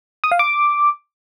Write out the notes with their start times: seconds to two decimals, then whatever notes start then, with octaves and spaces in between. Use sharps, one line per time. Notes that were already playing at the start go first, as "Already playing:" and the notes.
0.24 D#6
0.32 F5
0.39 D6